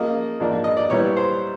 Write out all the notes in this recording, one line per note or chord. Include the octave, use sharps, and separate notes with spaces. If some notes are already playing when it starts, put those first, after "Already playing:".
Already playing: C#3 F3 A#3 D#5
G#2 F3 A#3 D4
D#5
D5
A#2 G3 B3 E4 C#5
C5